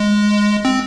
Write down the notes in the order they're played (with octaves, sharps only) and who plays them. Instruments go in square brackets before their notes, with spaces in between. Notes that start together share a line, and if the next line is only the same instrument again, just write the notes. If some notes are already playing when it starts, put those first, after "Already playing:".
Already playing: [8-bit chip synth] G#3
C4